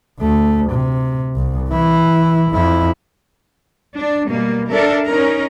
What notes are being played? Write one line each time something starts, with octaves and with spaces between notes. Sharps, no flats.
D2 A3
C3
C2
E3 E4
F2 E4
D4
B2 G3 A#3
D4 A4 A#4 E5
C#4 D#4 A#4